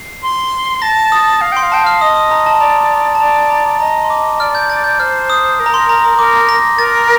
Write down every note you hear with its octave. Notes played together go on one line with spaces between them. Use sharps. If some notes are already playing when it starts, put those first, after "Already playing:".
Already playing: C7
C6
A5 A#6
D#6
F5
G5 C6
F5
G5 A5
F5 F6
D#5 D#6
D#6
A#5
A5
D5 A#5
A#5
A5
D5 A#5
A#5
D#5 A#5
C6
D6
D5 F6
G6
A6
G6
C5 F6
D#6
A#4
A#5
C6
A#5
A#5
A#4 D6
A#6
A#4 A6